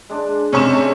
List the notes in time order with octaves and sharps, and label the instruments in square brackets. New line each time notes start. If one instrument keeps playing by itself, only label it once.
[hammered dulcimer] G#3 D4
[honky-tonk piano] C3 C#6 E7 [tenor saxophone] C#4
[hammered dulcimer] G#3 A3